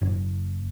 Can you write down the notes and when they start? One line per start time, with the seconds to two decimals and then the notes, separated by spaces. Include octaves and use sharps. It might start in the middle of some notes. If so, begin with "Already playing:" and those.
0.02 F#1